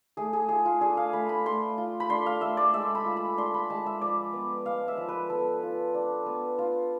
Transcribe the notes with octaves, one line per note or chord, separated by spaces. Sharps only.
A3 G#4
G#4
F4 G#4
F4
D4 G#4
F5
A3 B5
B5
A3 C6
F4
B5
D4 C6
F5
A3 E5
D5
G#3 E5
B5
F4
B5
D4 C6
B5
G#3 A5
E5
F3 D5
B3
G#3 F5
E5
F3
B4
B3 A4
F4
D4
B3
F4